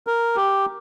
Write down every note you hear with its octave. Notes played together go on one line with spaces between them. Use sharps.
A#4
G4